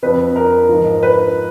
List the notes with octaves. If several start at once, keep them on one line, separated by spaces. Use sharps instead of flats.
F2 F3 B4
A#4
G#2 F3
B4